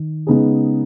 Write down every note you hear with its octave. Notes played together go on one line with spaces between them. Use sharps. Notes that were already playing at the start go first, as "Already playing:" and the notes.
Already playing: D#3
C#3 G#3 B3 D#4 G#4